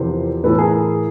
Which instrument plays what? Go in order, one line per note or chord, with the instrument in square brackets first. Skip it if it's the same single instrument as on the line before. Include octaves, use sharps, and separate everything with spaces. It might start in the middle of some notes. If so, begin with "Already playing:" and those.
Already playing: [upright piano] E2 C3 F3 A#4 C5
A2 E3 A4 B4
G#4 A#4